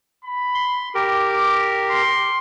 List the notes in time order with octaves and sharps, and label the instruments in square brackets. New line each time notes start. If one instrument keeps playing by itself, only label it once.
[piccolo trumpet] B5
[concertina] C6
[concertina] G4 A#4 [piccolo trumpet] D6
[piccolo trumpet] C6